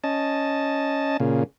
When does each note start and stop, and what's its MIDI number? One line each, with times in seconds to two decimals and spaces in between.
0.04 1.17 61
0.04 1.17 75
0.04 1.17 81
1.20 1.44 46
1.20 1.44 49